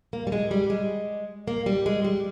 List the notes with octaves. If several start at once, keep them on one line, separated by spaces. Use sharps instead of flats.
A#3
G3
G#3
G3
G#3
A#3
G3
G#3
G3